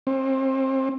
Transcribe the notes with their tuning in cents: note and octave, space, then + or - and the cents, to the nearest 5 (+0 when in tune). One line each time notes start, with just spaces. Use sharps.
C4 +30